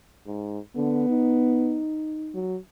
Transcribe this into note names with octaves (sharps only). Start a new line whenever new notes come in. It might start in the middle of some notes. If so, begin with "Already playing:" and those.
G#2
D3 B3
D#4
F#3